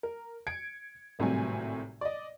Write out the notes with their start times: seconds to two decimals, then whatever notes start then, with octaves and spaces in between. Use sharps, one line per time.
0.03 A#4
0.47 G#6 C#7 D7
1.19 G#1 A2 C3 F#3 G3 G#5
2.01 D5 D#5